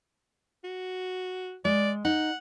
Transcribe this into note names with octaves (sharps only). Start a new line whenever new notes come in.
F#4
G#3 D5
D#4 F#5